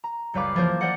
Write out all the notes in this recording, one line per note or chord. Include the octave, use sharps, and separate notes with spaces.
A#5
F#1 C#2 G3 B4 F5 D6
E3 F3 A#3 A#4 C5
A#4 C5 D5 D#5 F#5